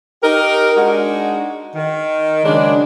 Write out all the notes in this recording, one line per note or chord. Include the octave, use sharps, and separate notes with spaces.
D#4 G4 A#4
G#3 D4 D#4 F#4
D#3
C#3 F#3 G#3 D4